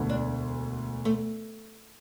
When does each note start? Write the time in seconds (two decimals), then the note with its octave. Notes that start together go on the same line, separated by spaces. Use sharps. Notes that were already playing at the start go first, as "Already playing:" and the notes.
Already playing: E1 D2 D3
0.10 D4
1.05 A3